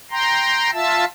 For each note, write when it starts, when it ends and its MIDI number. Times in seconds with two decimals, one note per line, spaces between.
0.11 0.70 79
0.11 0.70 82
0.11 0.70 84
0.74 1.05 65
0.74 1.05 76
0.74 1.05 81
0.74 1.05 88